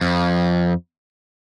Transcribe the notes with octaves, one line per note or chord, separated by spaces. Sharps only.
F2